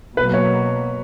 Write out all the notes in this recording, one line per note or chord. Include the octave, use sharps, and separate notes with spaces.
B2 F#3 A#3 B4
C#5